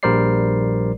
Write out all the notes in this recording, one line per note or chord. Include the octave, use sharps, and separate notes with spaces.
A#1 G3 A#4 C5 D5 C7